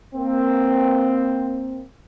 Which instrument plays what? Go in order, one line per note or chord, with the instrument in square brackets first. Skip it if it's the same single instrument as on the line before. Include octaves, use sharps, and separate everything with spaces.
[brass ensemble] A#3 C4